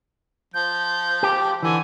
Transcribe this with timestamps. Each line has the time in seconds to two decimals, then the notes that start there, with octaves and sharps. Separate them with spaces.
0.54 F3 G6
1.23 G4
1.63 D3 E3 G#5